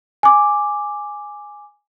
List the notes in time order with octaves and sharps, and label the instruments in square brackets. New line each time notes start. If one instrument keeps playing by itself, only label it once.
[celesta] G#5 D6